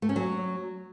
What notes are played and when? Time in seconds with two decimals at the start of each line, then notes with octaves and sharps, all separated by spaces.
0.02 A3
0.09 C#4
0.16 F#3